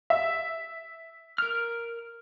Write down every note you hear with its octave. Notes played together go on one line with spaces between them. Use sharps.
E5
A#4 F6